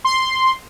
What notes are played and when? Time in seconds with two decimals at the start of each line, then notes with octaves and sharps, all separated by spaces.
0.04 C6